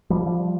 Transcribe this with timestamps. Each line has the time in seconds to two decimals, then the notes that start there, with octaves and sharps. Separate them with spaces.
0.10 F3 G3
0.27 F3 G3